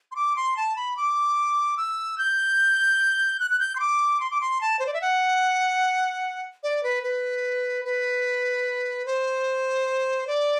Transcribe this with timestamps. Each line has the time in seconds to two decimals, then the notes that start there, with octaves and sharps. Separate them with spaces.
0.12 C6
0.16 D6
0.36 C6
0.57 A5
0.76 B5
0.97 D6
1.77 E6
2.18 G6
3.40 F#6
3.51 F#6
3.60 G6
3.76 C6
3.80 D6
4.20 C6
4.31 D6
4.41 C6
4.61 A5
4.79 C5
4.87 D5
4.94 E5
5.02 F#5
6.63 D5
6.83 B4
7.03 B4
7.85 B4
9.06 C5
10.27 D5